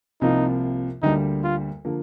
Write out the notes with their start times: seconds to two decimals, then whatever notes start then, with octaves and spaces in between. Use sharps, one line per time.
0.21 C2 C3 F3 A#3 D#4 F4
1.02 D2 D3 G3 A#3 D#4
1.44 F4
1.85 D3 F3 A#3